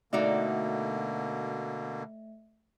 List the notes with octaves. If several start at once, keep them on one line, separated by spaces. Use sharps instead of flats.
B2 D3 A3 A#3 D#4 F#4 D5 E5